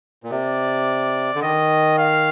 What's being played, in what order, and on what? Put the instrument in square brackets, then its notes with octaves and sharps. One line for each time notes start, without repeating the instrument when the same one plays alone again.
[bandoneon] A#2
[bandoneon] C3 [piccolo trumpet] D5
[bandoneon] D3
[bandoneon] D#3 [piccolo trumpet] D#5
[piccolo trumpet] F5